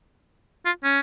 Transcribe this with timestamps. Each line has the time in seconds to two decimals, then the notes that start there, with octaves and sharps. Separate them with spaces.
0.65 F4
0.83 C#4